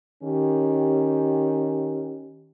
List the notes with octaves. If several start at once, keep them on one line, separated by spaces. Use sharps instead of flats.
D#3 C#4 G4